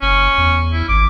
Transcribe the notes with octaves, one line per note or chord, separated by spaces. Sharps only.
F#1 C#4
E2
E4
G#1 D6